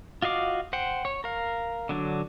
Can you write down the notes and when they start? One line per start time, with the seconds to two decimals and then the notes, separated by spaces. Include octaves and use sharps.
0.22 F4 F#4 D#5 F5 D6
0.73 C5 F#5 G5
1.05 C#5
1.24 A#4 F5
1.89 D3 F#3 D4